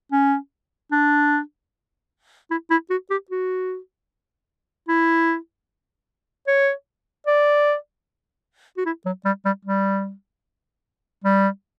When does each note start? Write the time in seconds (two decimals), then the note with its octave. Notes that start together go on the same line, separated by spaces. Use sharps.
0.12 C#4
0.92 D4
2.50 E4
2.70 E4
2.90 F#4
3.10 G4
3.30 F#4
4.89 E4
6.47 C#5
7.27 D5
8.77 F#4
8.86 E4
9.05 F#3
9.25 G3
9.45 G3
9.65 G3
11.24 G3